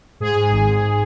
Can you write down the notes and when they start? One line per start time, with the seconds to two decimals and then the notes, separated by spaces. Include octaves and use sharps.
0.20 G#2 G#4
0.36 G#2
0.52 G#1
0.67 G#2